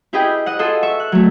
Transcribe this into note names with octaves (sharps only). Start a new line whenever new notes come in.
E4 G4 G#4 B4 D#5 G5
D#5 F#5
F4 G#4 A4 D#5
E5 C#6
F#6
F#3 A3